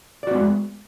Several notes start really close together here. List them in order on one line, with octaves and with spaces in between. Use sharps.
D5 F#4 B3 G#3